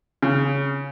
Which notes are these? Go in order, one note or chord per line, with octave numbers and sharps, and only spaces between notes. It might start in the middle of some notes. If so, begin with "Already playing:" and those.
C#3